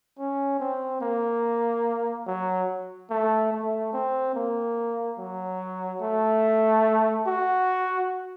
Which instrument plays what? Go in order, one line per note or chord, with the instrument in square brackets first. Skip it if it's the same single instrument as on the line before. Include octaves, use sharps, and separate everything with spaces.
[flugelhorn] C#4
C4
A#3
F#3
A3
A3
C4
A#3
F#3
A3
F#4